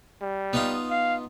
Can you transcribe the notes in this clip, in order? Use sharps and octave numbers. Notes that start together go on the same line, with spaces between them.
G3
B3 D#4 F4
F5